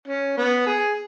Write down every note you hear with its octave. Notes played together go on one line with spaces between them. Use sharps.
C#4
B3
G#4